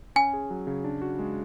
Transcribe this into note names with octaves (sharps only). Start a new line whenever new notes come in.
C#4 G#5
G#4
F#3
C#3
D4
F#4
G#3